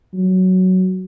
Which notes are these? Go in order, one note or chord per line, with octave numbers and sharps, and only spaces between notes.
F#3